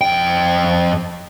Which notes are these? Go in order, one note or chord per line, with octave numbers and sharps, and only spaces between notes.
F2 G5